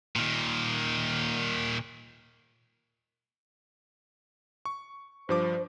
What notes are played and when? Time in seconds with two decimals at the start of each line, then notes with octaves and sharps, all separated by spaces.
0.16 A#2 D#3
4.65 C#6
5.29 G2 F3 C5 D6